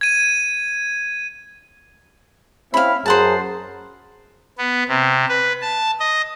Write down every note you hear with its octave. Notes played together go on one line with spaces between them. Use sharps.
G#6 D#7
C4 C#4 E4 F5 B5
F#2 G#4 C5 F#5 A5 A#5
B3
C3
B4
A5
D#5